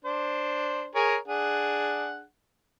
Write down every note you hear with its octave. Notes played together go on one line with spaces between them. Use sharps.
D4 C5
G#4 A#4 C#5
D4 G#4 F#5